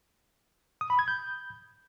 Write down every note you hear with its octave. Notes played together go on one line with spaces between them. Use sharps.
D#6
B5
G#6
G6